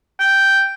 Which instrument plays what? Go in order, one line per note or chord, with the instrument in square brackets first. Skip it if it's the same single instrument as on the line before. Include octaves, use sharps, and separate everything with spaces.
[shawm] G5